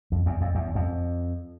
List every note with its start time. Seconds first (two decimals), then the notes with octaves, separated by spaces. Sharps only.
0.12 F2
0.26 E2
0.41 F2
0.55 E2
0.75 F2